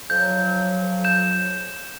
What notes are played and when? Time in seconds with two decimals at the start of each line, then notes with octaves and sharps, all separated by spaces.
0.10 F2 F3 F#3 G6
1.04 G6 E7